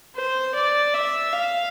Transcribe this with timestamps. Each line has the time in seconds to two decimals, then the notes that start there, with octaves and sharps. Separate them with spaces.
0.16 C5
0.55 D5
0.94 E5
1.32 F5